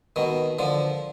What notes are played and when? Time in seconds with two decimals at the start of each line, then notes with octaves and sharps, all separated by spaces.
0.16 B2 D#3
0.59 D3 F3